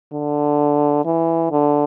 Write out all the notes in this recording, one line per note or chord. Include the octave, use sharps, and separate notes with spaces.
D3
E3
D3